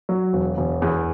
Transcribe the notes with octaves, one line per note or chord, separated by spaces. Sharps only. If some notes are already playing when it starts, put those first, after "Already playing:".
F#3
E1
E1
E2